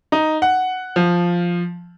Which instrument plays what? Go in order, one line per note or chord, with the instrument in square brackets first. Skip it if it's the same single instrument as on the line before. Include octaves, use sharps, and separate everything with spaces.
[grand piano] D#4
F#5
F3